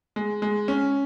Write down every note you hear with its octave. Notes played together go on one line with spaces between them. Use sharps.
G#3
G#3
C#4